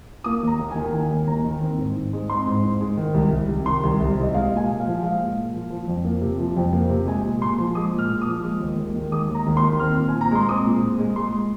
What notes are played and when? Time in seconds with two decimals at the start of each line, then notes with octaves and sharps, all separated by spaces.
0.24 A#3 D#6
0.43 D#2 A#5
0.59 D#2
0.71 G#5
0.76 D#3
0.93 A#3 G#5
1.11 D#2
1.27 D#2 A#5
1.45 D#3
1.61 C4
1.78 G#2
1.96 G#2
2.13 G#3
2.29 C4 C6
2.47 G#2
2.64 G#2
2.81 G#3
2.97 D#3
3.14 C2
3.31 C2
3.48 C3
3.66 D#3 C6
3.83 C2
4.00 C2
4.17 C3 D#5
4.34 G#3 F5
4.52 A#2 G#5
4.68 A#2
4.80 F5
4.86 F3
5.02 G#3 F5
5.19 A#2
5.37 A#2
5.53 F3
5.70 F3
5.88 F2
6.04 A#3
6.22 C3
6.39 F3
6.57 F2
6.73 A#3
6.89 C3
7.07 G#3 G#5
7.24 A#2
7.41 A#2 C6
7.58 F3
7.75 G#3 D#6
7.93 A#2
7.98 F6
8.09 A#2
8.21 D#6
8.27 F3
8.43 G#3
8.60 D#2
8.78 D#2
8.95 D#3
9.12 G#3 D#6
9.29 D#2
9.35 A#5
9.46 D#2
9.57 C6
9.63 D#3
9.80 C4 F6
9.96 A#2
10.08 G#5
10.14 A#2
10.21 A#5
10.31 G#3 C6
10.49 C4 D#6
10.66 A#2
10.82 A#2
10.99 G#3
11.16 G#3 C6